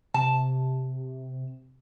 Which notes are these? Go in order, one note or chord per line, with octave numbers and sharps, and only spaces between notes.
C3 A5